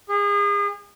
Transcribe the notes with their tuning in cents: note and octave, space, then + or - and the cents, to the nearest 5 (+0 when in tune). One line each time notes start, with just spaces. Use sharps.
G#4 -35